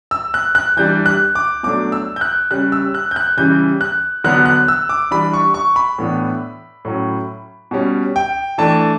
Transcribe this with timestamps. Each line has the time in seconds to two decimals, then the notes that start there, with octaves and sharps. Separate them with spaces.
0.11 E6
0.34 F#6
0.55 F#6
0.77 E3 G3 D4 G6
1.06 F#6
1.35 D6
1.63 B2 F#3 A3 D4 D6
1.92 E6
2.16 G6
2.21 F#6
2.51 C#3 G3 C#4 F#6
2.72 E6
2.94 F#6
3.11 G6
3.16 F#6
3.37 C#3 E3 G3 G6
3.81 F#6
4.24 D3 F#3 B3 D4 F#6
4.45 F#6
4.68 E6
4.89 D6
5.11 E3 G3 D4 B5
5.33 C#6
5.54 C#6
5.76 B5
5.98 A2 E3 B3 D4
6.85 A2 F#3 C#4
7.71 B2 G3 C#4
8.16 G5
8.58 E3 A3 D4 A5